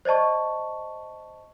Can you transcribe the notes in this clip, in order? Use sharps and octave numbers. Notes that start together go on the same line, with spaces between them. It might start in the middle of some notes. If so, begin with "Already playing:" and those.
C5 D5 D#5 A5 C#6